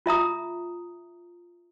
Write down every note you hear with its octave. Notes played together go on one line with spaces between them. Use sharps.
F4 E5 A#5 D#6